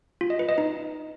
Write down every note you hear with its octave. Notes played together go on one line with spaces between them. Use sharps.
F4
D#5
B4
D#5
D#4